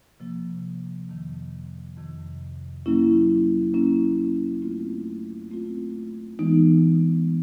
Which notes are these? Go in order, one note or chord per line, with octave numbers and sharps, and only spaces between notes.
C3 F3 A#3
F2 C3 D#3
F2 C3 D#3
F#3 A#3 C#4 E4
F#3 A#3 C#4 E4
A3 C4 F4
A3 C4 F4
E3 G#3 B3 D#4